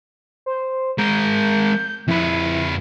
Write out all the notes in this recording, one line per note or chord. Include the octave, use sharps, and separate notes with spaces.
C5
G#3 A#4 G6
F2 E4 B4